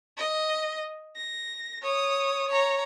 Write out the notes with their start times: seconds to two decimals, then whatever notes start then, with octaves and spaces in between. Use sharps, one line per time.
0.18 D#5
1.16 A#6
1.82 C#5 D#6
2.48 C#5 A#5